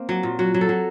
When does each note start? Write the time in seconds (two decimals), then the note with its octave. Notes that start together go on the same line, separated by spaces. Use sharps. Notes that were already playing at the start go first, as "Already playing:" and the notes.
Already playing: A#3 C4
0.09 F#3
0.23 A#2
0.39 F#3 F#4
0.54 F#3
0.61 A4
0.69 F#3